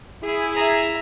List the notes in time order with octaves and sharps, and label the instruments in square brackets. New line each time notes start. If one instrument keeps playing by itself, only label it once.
[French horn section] E4 G#4
[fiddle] E5 A#5